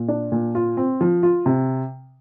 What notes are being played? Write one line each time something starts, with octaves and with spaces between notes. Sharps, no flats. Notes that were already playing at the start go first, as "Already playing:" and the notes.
Already playing: A#2
D4
A#2
F4
C4
F3
F4
C3